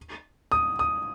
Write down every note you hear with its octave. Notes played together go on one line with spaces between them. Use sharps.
D#6
D#6